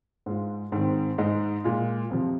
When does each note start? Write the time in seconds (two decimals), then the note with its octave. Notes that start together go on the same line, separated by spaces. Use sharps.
0.26 G#2 G#3 F4
0.72 G#2 D#3 C4
1.18 G#2 G#3 D#4
1.64 A#2 G#3 F4
2.10 F2 C3 F3